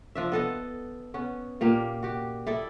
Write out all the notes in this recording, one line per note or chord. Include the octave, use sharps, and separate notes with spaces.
F3 D4 E5
B3 A4 D#5
B3 C#4
A#2 A#3 G4
F#4 G4
E4 A4 D5 D#5